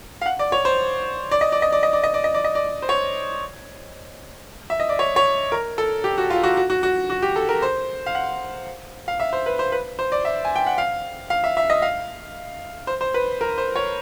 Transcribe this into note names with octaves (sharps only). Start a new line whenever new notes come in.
F5
F#5
D5
C#5
C5
D5
D#5
D5
D#5
D5
D#5
D5
D#5
D5
D#5
D5
D#5
D5
C5
C#5
E5
D#5
D5
C#5
C#5
A#4
A4
G4
F#4
F4
F#4
F#4
F#4
F#4
F#4
G4
A4
A#4
C5
F5
F#5
F5
E5
C5
B4
C5
B4
C5
D5
E5
G#5
G5
F#5
F5
F5
E5
E5
D#5
F5
C5
C5
B4
A#4
C5
C#5